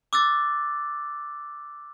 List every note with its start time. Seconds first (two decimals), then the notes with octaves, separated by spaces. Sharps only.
0.13 D6 E6 F#6 A6